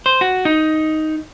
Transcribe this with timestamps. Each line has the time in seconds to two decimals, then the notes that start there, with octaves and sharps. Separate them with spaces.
0.06 C5
0.21 F#4
0.45 D#4